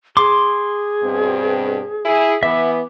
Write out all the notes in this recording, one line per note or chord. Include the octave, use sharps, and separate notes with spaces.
G#4 C6 D6
G2 B2 C4
E4 G#4
E3 B3 E5 D6